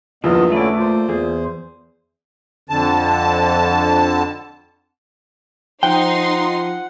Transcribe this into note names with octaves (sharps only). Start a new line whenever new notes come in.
E2 G2 A#2 E3 F3 B3 D#5
D3 A3 C#4 E4 D5
A#2 C5
E2 G#4
F2 D3 A5
F3 D#4 F#5 G5 C6